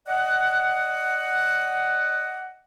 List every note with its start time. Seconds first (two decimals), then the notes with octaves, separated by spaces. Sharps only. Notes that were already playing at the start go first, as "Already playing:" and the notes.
0.07 D5 D#5 F#5